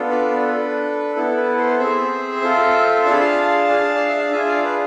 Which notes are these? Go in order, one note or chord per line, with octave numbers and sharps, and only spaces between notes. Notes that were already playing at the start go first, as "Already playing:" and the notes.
Already playing: B3 D4 F4 A4
B4 D5
B4
D4 A4
B3 E4 A4
B4
A4 C5
C4 G#4 C5 E5
C4 F4 A4
D4 F4 G#4 A5 B5
F5 A5
D4 G#4
D5
E5
F5
D4 F4 G#4 E5 G#5
D5 F5
B4 D5